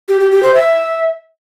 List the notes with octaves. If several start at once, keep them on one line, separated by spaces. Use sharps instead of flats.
G4
G4
G4
C5
E5